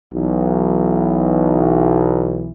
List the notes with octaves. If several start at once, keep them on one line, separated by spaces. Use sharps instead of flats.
B1 E3